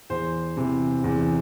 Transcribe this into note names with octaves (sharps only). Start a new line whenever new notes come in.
E2 C5
C3 E3
E2